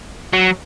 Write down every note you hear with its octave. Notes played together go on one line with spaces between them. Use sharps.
F#3